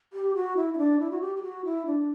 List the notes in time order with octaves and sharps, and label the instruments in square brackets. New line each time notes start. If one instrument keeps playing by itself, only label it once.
[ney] G4
F#4
E4
E4
D4
E4
F#4
G4
G4
F#4
E4
D4